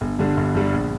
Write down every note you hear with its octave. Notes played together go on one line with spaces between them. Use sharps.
G1
G2 D3 G3 D4
G1
G2 D3 G3 D4
A#1